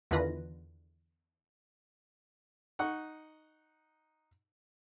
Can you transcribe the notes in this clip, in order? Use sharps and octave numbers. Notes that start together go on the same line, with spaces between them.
E2 D3 D#3 F4 B4 A#6
D#4 F#5 C#6